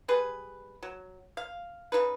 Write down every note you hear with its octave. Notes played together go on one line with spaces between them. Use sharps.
G3 G#4 B4
F#3
F5
C#3 G3 D#4 B4